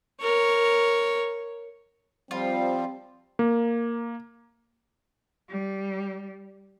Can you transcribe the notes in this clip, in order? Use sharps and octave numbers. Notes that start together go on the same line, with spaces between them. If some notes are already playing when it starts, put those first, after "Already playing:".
A#4 C#5
F3 G3 C4 F4
A#3
G3